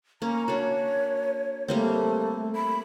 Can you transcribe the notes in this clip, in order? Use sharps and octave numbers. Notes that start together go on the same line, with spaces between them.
A#3 C#4 A#5
D4 F#4 C#5
G3 A3 A#3 C4
B5